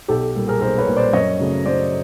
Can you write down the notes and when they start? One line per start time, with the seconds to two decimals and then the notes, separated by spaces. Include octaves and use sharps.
0.08 B1 G4 A4
0.35 A#2 G3 A#3
0.48 G#4 A#4
0.61 B1 A#4 C5
0.78 B4 C#5
0.87 A#2 G3 A#3
0.96 C5 D5
1.13 F#2 C#5 D#5
1.40 C#3 F#3 A3
1.66 F#2 C5 D5